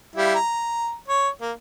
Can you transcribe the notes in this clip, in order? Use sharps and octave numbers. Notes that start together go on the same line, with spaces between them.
G3 E4 F5
A#5
C#5
A#3